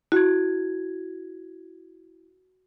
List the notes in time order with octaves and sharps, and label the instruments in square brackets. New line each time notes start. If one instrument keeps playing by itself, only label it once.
[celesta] E4 G#6 [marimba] F#4